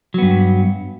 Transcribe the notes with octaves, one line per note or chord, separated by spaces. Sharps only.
G2 F#3 B3